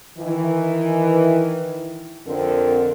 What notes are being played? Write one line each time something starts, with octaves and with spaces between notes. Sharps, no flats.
D#3 E3
F2 D3 C4 A#4